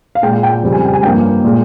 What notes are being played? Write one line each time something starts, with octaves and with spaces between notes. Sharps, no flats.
F5
A#2 G#3 G5
G5
F2 C#3 G3
G#5
G5
G#5
G2 F3 A#3 G5
A#2 G#3